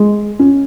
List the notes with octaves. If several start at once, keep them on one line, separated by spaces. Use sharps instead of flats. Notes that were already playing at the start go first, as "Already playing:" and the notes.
Already playing: G#3
C#4